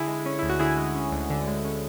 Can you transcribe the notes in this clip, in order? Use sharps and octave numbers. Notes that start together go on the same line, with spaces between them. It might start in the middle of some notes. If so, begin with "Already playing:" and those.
Already playing: D3 E4 G#4
G#3
C#4
D2 E4
F#4
D3 E4 G#4
G#3
C#4
D2
D3
G#3
C#4